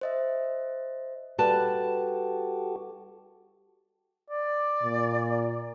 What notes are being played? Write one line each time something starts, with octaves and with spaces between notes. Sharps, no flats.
C5 D#5 E5
G3 F#4 G4 A4 B4 A5
D5
A#2